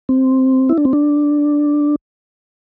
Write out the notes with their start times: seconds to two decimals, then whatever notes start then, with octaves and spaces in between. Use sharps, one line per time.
0.09 C4
0.69 E4
0.78 D4
0.85 C4
0.93 D4